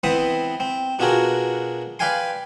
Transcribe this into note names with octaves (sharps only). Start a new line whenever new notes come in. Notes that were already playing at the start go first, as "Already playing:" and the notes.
E3 B3 C4 C5 E5 D#6
C4
B2 D4 F4 F#4 G#4 A#4
B4 D5 F5 G5 G#5 C6